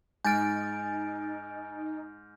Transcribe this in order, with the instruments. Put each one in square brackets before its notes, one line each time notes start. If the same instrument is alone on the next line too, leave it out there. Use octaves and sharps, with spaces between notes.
[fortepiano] G#2 [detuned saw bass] D#4 [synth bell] G#5 A6 D7 [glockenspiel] F6 G6